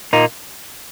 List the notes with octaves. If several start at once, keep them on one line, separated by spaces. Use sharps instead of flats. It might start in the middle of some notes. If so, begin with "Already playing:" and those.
A#2 A#3 D#4